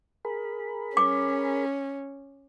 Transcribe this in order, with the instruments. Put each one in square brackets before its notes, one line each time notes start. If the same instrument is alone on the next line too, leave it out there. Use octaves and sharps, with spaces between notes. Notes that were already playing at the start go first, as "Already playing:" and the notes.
[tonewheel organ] G#4 A#4 B5
[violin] C#4 [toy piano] D6